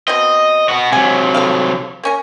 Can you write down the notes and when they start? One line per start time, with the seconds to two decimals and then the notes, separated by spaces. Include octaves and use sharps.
0.08 B2 C4 D#5
0.69 B3 F#4
0.92 C3 F#3 G#5
1.34 A4 C5 F5
2.03 A#3 C#4 A#4